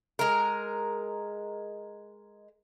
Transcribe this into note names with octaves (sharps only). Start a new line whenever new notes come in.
G#3 A#4